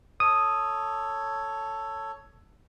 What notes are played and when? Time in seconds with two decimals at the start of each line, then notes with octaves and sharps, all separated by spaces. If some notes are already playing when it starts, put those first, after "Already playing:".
0.20 A4 C#5 D#6